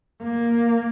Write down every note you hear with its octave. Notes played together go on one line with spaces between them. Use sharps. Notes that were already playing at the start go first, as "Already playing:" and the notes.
A#3